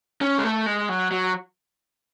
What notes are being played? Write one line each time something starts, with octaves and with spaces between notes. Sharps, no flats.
C#4
G#3
A3
G#3
F#3
F#3